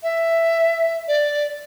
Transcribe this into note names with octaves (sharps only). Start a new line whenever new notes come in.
E5
D5